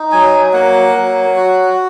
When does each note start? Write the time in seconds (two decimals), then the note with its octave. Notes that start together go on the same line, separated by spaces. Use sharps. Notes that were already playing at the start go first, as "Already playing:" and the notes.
Already playing: D#4
0.12 F#3 G#5
0.53 A#3 F#5
0.95 F#3
1.36 F#4